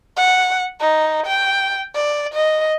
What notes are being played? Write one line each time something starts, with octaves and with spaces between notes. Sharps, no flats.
F#5
D#4
G5
D5
D#5